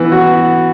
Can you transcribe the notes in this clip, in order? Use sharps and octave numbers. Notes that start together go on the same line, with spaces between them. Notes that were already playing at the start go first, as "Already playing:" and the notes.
Already playing: E3 B3
F#4